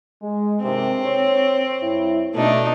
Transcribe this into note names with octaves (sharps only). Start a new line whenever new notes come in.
G#3
G2 C3 D#3 C4
C#5
G2 E4
B2 A3 D4 D#4